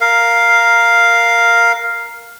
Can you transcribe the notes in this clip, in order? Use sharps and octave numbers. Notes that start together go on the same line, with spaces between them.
A#4 F5